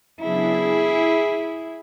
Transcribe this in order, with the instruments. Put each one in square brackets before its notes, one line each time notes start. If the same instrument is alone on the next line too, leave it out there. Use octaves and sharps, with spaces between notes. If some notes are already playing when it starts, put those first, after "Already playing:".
[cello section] C#3 F#3 B3 D4 E4 G#4